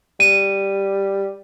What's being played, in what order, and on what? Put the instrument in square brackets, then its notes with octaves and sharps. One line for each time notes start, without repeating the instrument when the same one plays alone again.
[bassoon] G3 [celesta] D#7